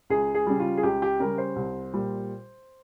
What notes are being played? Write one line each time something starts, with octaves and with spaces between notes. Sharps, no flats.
C#2 G#4
G#4
C#3 G3
F4
G#4
C#2 G4
G4
C#3 G3 A#4
C5
C2
A#2 G3